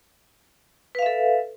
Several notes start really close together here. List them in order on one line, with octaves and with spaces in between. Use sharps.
B4 F5 E5 A4